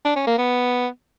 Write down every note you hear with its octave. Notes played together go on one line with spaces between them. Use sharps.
D4
C#4
A#3
B3